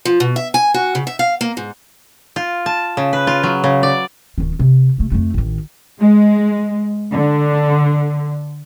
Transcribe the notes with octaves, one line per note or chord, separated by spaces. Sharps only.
F3
B2
E5
G#5
F#4
C#3
E5
F5
A#3
G#2
F4
A5
C#3
B4
F4
F#3
C#3
D5
D1 D#3
C3
C3 A3
F2 A3
A1 D#3
G#3
D3